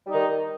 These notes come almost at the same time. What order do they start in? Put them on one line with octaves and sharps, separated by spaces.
G3 D#4 D#3